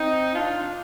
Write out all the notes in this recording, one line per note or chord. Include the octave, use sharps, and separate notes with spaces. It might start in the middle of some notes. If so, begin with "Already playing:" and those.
Already playing: C4 D#4
D4 F4